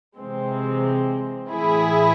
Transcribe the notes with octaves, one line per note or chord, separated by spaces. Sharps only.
C3 E3 G#3 C4
A2 E3 E4 G#4